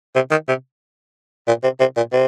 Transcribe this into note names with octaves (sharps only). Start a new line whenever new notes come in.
C3
D#3
C3
A#2
C3
C3
A#2
C3